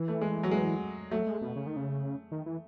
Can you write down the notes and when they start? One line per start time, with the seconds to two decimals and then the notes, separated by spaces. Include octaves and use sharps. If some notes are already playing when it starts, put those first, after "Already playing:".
Already playing: E3
0.08 A3
0.21 G#3
0.43 F#3
0.51 G#3
1.11 F#3 A3
1.27 G#3
1.42 B2
1.56 C#3
1.67 D#3
1.77 C#3
2.32 D#3
2.46 E3